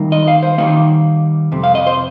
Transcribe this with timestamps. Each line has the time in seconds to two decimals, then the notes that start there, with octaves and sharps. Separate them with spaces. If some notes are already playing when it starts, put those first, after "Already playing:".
Already playing: D#3 G3 A#3 D#4
0.12 D#5
0.28 F5
0.43 C5
0.58 D#3 G3 A#3 D#4 F5
1.52 F2 C3
1.64 F5
1.75 D#5
1.87 C5